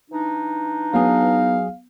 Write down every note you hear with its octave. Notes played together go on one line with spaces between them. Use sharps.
E3 D4 D#4
F#3 B3 G#4 F5